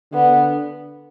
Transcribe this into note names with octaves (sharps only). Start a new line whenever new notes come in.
D3 B3